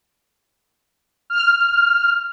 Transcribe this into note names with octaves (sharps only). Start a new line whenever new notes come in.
F6